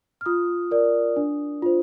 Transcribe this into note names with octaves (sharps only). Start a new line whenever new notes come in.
F6
F4 D#6
A#4 D5
D4
F4 C5